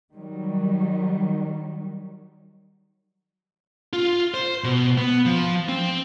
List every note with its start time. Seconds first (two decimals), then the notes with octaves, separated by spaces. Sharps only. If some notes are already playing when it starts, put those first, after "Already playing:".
0.14 D#3 F#3 G3
3.93 F4
4.34 C5
4.64 B2
4.98 B3
5.26 F3
5.69 C4